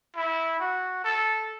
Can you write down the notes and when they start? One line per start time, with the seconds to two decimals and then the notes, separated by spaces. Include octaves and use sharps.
0.16 E4
0.60 F#4
1.04 A4